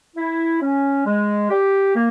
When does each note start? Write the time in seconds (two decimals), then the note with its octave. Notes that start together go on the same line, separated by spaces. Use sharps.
0.16 E4
0.61 C#4
1.05 G#3
1.50 G4
1.95 A#3